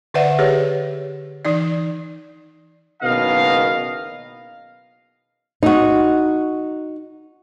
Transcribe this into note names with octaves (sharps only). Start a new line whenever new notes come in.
D3 B4 C5 D5 E5 F#5
G4 G#4 B4 C#5
E3 D#4 D5
F#1 B2 D#3 D#5 F5
D#4 F#4